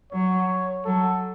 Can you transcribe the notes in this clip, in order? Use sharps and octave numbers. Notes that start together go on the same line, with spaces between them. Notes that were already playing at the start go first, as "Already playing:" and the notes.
F#3 C#5
F#3 A4